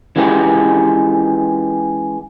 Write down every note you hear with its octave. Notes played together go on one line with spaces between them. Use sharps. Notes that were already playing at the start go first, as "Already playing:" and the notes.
E3 G#3 C#4 F4 G4